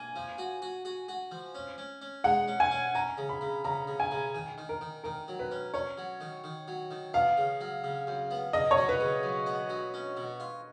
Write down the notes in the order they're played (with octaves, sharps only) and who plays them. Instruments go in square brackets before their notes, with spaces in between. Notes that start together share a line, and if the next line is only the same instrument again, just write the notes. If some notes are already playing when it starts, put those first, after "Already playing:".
Already playing: [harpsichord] A#3 [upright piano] G#5
[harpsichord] F3
F#4
F#4
F#4
F#4
F3
C#4
C#4
C#4
[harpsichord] G#3 [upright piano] F#5
[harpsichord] C#4
[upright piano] G#5
[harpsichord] C#4
[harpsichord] C#4 [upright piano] A#5
[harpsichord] C#3
[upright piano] B5
[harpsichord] C#3
[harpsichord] C#3 [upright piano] A#5
[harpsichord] C#3
[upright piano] G#5
[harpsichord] C#3
D#3
D#3
[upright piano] A#4
[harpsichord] D#3
[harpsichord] D#3 [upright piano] A#4
[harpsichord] F#3
[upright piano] B4
[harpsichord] C#4
[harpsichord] C#4 [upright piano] C#5
[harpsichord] F#3
D#3
D#3
F#3
D#3
[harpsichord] B3 [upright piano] F5
[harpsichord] C#3
F#3
C#3
F#2
B3
[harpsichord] C#3 [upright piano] D#5
[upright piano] C#5
[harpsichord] F#3
[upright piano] B4
[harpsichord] C#3
F#2
B3
F#3
C#4
B2
F4